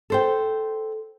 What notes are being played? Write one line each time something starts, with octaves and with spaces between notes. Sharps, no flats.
A4 C5 G5